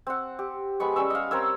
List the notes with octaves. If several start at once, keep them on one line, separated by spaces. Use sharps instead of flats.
C4 F#5
G4
G#3 B3 B5 C#6
G3 C#4 C#6 E6
D#5 F5
C4 A#4 C#5 E6